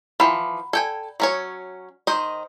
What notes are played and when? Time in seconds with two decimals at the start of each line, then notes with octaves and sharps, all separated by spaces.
0.20 E3 F3 F#5 A#5 B5
0.73 A4 D5 G5 G#5
1.20 F#3 C#4 C#5
2.07 D#3 C5 D#5